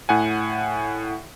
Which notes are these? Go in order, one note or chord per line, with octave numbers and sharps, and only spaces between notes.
A2 F#5 G#5